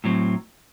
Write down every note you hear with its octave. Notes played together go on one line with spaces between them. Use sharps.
A2 F#3 C4